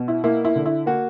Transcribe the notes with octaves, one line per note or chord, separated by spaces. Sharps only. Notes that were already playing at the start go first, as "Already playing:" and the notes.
Already playing: B2
E4
A#3 E4
E4
D3
E4
A#3 F#4